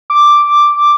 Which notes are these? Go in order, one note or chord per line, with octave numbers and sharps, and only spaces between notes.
D6